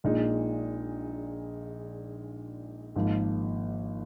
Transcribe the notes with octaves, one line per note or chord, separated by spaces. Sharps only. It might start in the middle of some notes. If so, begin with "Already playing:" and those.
A#1 A#2 G#3 D#4
G#1 G#2 F3 A#3